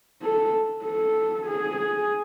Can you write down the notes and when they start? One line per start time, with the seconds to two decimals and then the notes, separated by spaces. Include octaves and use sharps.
0.22 A4
0.84 A4
1.46 G#4
1.76 G#4